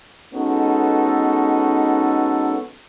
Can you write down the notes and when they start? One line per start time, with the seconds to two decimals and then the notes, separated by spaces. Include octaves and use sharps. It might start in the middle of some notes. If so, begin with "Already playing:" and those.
0.34 G#3 B3 C#4 D#4 F#4 A4